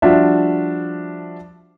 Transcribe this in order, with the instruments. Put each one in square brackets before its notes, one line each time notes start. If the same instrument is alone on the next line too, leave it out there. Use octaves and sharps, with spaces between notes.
[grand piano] F3 G3 D4 F4 F#4 E5